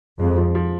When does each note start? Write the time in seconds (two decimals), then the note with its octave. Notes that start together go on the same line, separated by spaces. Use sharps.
0.20 F2 G#3
0.38 F3
0.55 F3